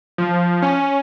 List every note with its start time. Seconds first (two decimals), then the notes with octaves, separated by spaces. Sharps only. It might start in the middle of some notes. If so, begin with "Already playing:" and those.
0.18 F3
0.62 C#4